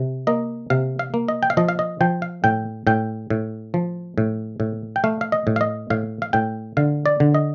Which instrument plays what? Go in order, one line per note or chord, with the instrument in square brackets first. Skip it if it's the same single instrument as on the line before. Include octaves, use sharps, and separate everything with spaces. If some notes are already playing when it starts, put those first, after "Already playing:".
Already playing: [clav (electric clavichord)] C3
A#3 D#5
C3 F5
F5
A#3
D#5
G5
F5
F3 D#5
F5
D#5
F3 G5
F5
A2 G5
A2 G5
A2
F3
A2
A2
G5
A3 F5
F5
D#5
A2
F5
D#5
A2 F5
F5
A2 G5
D3 F5
D5
D3
D#5